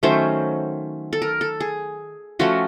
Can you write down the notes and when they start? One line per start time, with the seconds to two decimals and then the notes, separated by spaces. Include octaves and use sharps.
0.03 D#3 F#3 A3 C#4 C5
1.13 A4
1.22 A#4
1.41 A4
1.60 G#4
2.39 F3 A3 C#4 F4 F#4